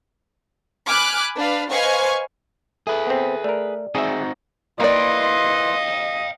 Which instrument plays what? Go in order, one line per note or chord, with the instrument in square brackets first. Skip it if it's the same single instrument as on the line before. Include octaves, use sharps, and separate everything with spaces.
[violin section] G#5 B5 D6 F6 F#6
D4 B4 F5
B4 C5 D#5 F5 G#5 C#6
[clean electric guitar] G#4 B4 [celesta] A4 E5
[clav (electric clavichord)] B3 C4
[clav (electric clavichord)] A3 A#4 [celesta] D5
[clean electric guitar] C4 D#4 F#4 [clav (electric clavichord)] G#4 E5
[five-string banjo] A#3 D5 [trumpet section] E4 B4 C6 [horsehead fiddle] D#5 [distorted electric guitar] F5 G5